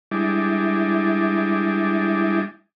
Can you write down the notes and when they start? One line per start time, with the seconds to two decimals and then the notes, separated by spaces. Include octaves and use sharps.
0.11 G3 G#3 D4 E4